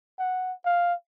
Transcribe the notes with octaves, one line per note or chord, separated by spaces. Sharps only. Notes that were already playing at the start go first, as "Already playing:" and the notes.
F#5
F5